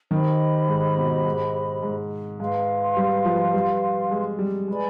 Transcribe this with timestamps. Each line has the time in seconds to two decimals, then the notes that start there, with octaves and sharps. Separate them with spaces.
0.11 D#3 G4 C5 D#5 B5
0.68 G#2
0.97 B2
1.25 G#2
1.83 G#2
2.39 G#2 B4 F5 C6
2.97 G3
3.25 F3
3.53 G3
4.11 G#3
4.39 G3
4.67 G#3 B4 D5 G#5 B5